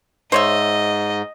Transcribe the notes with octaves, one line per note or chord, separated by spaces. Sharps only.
G#2 C5 C#5 D#5 E5